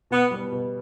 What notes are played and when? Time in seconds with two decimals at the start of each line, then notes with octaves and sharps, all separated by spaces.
0.11 B2 B3
0.31 G3 B3
0.52 B2